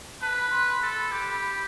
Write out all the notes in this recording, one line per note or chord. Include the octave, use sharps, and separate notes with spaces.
B4 A5
B5
B5
C6
C6
A4 B5
G4
B5